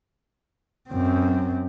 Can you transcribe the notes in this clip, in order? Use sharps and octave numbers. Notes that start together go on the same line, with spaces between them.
F#2 C4